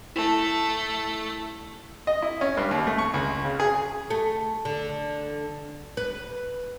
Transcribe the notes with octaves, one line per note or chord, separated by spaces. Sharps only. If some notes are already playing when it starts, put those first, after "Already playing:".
A3 E4 A5
D#5
E4
C#4
G2
D#2
A3
C#6
C#2
C#3
G#4
A3
D3
B4